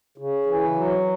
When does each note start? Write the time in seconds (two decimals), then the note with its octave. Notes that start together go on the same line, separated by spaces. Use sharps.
0.18 C#3
0.46 E3
0.75 F#3